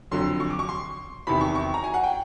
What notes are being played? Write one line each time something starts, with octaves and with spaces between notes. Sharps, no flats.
F2 D3 F#3 C6
C#6
D6
C#6
C6
E2 C3 D#3 B5
C#6
C#6
A#5
G#5
F#5
G5